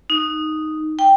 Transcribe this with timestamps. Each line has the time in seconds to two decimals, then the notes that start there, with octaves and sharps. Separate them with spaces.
0.10 D#4
0.99 G5